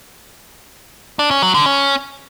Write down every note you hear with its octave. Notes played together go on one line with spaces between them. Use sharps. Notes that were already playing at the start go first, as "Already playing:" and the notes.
D4
C#4
F#3
D3
C#4